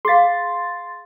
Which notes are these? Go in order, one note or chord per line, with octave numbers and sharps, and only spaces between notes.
G#4 F5 C6 A6